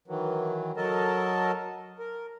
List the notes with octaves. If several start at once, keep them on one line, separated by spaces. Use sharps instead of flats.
D#3 E3 F#3
F#3 A4 A#4 D#5 A5
A#4